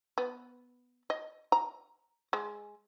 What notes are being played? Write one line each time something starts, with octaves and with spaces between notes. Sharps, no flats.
B3
D#5
A#5
G#3